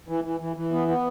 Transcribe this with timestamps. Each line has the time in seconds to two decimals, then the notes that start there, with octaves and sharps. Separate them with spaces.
0.08 E3
0.24 E3
0.40 E3
0.56 E3
0.72 B3
0.88 B3